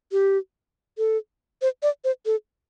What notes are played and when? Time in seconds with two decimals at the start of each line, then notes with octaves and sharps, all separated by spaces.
0.12 G4
0.98 A4
1.62 C5
1.83 D5
2.04 C5
2.26 A4